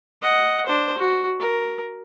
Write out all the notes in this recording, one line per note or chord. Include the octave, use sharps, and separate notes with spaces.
D#5 F#5
D4 C5
F#4
A#4